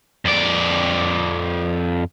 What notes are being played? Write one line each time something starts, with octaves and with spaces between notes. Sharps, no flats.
F2 D5